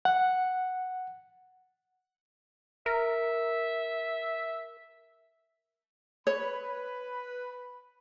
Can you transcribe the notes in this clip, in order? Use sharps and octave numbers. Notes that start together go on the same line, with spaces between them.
F#5
A#4 E5
B4 C#5 B5